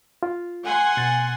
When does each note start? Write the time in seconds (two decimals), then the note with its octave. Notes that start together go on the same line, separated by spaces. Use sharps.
0.23 F4
0.65 F#5 G#5 C6
0.97 B2 A6